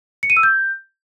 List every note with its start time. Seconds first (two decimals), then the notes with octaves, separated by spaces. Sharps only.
0.23 C#7
0.30 D#7
0.37 E6
0.43 G6